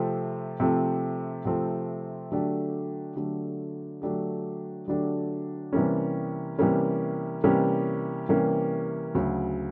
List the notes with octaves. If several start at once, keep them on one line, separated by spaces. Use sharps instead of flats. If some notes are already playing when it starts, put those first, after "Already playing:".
Already playing: C3 F3 A3 C4
C3 F3 A3 C4
C3 F3 A3 C4
D3 F#3 A3 D4 G4
D3 F#3 A3 D4 G4
D3 F#3 A3 D4 G4
D3 F#3 A3 D4 G4
C3 E3 G3 A#3 C#4
C3 E3 G3 A#3 C#4
C3 E3 G3 A#3 C#4
C3 E3 G3 A#3 C#4
D2 C#3 F#3